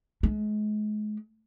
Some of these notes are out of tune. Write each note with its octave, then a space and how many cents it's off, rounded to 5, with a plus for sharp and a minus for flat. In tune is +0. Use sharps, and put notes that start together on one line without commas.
G#3 +35